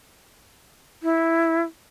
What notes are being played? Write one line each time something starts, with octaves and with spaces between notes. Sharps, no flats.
E4